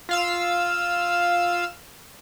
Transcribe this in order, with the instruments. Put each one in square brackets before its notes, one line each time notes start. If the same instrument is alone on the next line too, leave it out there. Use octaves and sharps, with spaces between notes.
[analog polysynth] F4 F5 E6